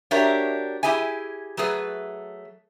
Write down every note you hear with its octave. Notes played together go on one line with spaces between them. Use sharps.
D4 F#4 G4 A#4 C#5 E5
E4 G4 G#4 E5 G#5
F#3 A3 G#4 B4